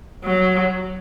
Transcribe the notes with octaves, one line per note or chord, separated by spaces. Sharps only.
F#3